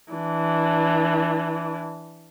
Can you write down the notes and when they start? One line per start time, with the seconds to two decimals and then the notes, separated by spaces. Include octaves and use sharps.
0.13 E3 D4